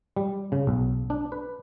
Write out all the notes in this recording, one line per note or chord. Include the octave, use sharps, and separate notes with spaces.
G3
C#3
B1
D4
B4